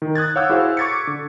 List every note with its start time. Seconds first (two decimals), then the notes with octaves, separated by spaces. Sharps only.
0.02 D#3 D#4
0.15 D#6 F#6 G#6 A6
0.36 C#5 F5 F#5 D6 E6 G6
0.50 E4 F#4 G#4 C5 F5 F#5
0.77 C#6 D6 G#6 A6 B6 C#7
1.07 D3